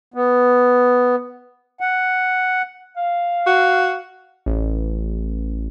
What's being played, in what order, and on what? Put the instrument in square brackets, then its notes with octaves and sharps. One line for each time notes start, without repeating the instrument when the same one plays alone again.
[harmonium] B3
F#5
[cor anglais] F5
[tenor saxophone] F#4
[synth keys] A1